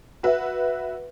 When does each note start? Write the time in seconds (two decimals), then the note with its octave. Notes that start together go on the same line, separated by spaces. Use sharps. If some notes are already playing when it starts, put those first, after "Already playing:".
0.23 F#4 B4 E5